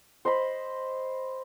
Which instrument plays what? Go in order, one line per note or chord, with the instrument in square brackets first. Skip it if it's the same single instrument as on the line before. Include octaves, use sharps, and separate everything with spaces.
[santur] C5 D#5 B5